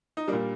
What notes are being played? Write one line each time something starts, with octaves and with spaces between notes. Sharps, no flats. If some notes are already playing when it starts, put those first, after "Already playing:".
D#4
G3 A#3 D4
A#2